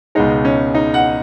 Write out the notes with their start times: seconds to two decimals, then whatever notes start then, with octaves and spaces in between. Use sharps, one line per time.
0.15 C#2 B2 G#3 D#4
0.45 C#4
0.75 D#4
0.94 F#5